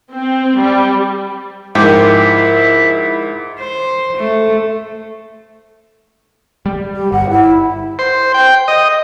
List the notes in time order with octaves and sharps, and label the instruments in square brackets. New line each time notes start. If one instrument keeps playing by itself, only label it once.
[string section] C4
G3
[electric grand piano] G#2 [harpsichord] D#3 F3 [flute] E4 [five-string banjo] G4
[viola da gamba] C5
A3
[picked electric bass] G3
[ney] G4
[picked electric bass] G1 [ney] F#5
[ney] E4
[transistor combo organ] C5
G5
D#5